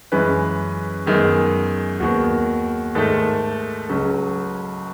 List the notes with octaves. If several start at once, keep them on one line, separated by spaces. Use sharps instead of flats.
F#2 E3 G#3 C#4 B4
F#2 D#3 G#3 B3 G#4
D#2 D#3 G#3 B3 F#4
G#2 D#3 A3 A4
C#2 C#3 F#3 C#4